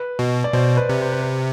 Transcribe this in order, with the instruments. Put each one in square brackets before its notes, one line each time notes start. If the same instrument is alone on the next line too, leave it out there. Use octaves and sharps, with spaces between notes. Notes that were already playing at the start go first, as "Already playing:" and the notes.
Already playing: [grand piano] B4
[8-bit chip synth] B2
[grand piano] D5
[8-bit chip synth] B2 [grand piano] C5
[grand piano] B4
[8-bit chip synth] C3
[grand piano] C5
B4
C5